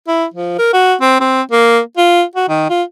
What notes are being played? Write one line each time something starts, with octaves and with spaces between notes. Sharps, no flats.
E4
F3
A#4
F#4
C4
C4
A#3
F4
F#4
D#3
F4